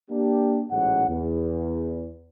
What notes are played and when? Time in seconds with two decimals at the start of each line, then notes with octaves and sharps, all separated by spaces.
0.11 A#3 D4 G4
0.70 A1 G#2 F#3 F#5
1.09 E2